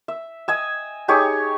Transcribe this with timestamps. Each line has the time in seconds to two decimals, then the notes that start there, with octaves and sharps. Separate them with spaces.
0.08 E5
0.48 D#5 G#5 E6
1.08 D#4 G4 G#4 C#5